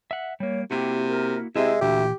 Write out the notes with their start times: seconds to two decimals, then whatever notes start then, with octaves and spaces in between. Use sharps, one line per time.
0.11 E5 F#5
0.40 G3 A#3 C#5
0.71 C3 A#3 E4 F#4 G4
1.09 A#4
1.56 C3 G#3 C4 E4 E5
1.81 D2 A#2 E3 G4